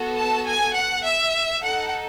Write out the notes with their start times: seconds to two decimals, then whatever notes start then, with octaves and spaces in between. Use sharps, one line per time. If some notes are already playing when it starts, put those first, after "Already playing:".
Already playing: B3 F#4 A4
0.16 A5
0.46 G#5
0.76 F#5
1.05 E5
1.62 D#4 A4 F#5